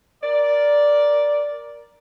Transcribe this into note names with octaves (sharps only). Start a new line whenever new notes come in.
A#4 D5